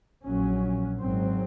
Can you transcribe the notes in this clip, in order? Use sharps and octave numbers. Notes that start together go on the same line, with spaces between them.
A#1 A#2 F#3 C#4
G#1 G#2 F#3 C4